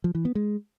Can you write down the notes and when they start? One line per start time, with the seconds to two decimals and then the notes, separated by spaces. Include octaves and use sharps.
0.04 F3
0.15 E3
0.25 B3
0.35 G#3